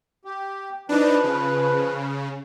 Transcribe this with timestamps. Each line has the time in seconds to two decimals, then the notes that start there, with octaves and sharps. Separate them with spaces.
0.25 G4
0.89 F3 D4 D#4 B4
1.24 C#3